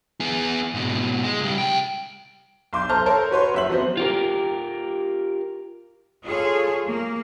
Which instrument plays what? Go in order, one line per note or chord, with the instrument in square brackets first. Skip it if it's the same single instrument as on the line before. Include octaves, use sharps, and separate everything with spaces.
[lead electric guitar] B3 G#4
G#2 B2
G#3
C#2 G3
C2 G5
[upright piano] B1 C6 D6 G6
A4 C5 A5 A#5 F6 G6
A4 A#4 C5 C#5 A5
F#4 B4 C#5 C6
F#1 E5 F#7
F3 F#3 B3 C4 C5
[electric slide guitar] F4 G4 A#4
[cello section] F4 G#4 A4 C#5
A#3